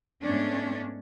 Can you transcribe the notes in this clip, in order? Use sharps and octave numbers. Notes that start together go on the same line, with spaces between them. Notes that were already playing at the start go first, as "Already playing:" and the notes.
G#2 A3 B3 C#4 D4